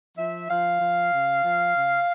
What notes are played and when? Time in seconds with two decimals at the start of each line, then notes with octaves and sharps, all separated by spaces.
0.18 F3 E5
0.49 F3 F5
0.80 F3
1.12 C#3
1.44 F3
1.75 C#3